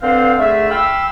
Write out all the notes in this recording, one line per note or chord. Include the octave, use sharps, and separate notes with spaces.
D3 C4 B4 C5 F5
D3 A3 G#4 E5
F5 G5 B5 E6